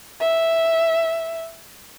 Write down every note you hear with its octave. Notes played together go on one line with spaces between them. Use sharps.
E5